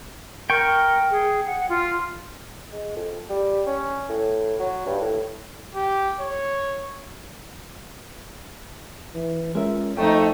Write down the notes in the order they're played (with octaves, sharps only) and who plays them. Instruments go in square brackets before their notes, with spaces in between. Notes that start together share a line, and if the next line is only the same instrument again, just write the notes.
[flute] A#4 [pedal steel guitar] G5 C#6
[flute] G#4
F#5
F4
[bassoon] G#3
F2
G3
C#4
A2
F#3
G2
A2
[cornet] G4
C#5
[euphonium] E3
[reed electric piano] G#3 A#4 E5 [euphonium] C#4 [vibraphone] F4
[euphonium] F2 [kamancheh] A3 D#4 [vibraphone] D#5 A#5 C#6 [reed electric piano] G5